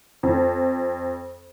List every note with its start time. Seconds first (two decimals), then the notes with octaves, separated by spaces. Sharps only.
0.23 F2